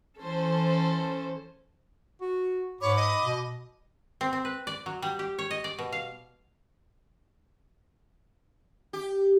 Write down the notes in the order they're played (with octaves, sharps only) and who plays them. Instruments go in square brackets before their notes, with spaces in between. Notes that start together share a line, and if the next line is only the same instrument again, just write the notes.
[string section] E3 C#4 A4 C5
[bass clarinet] F#4
[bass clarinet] G#2 [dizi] C#5 [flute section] B5 D6
[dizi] D#5
[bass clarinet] B2
[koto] C4
C4
B4
D5
F#3
G3
G4
C#5
D#5
D5
B2
F5
[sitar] G4